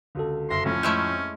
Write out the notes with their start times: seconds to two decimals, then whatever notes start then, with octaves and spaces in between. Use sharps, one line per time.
0.15 C#2 D3 F#4 A4
0.50 F#1 E5 C6 A#6
0.65 F2 A2 F3 C#4
0.83 G#3 A3 E4 E6 F6 G6